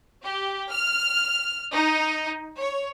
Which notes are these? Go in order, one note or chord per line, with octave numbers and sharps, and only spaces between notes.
G4
F6
D#4
C#5